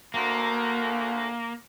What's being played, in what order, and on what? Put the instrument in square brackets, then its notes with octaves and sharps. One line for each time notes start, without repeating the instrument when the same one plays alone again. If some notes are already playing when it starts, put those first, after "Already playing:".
[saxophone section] D2 [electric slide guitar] A#3